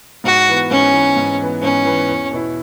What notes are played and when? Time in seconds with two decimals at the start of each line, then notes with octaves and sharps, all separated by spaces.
0.24 G#2 F#4
0.48 E3 B3
0.70 G#2 C#4
0.94 E3 B3
1.16 G#2
1.40 E3 B3
1.62 G#2 C#4
1.85 E3 B3
2.09 E2
2.31 B2 B3 E4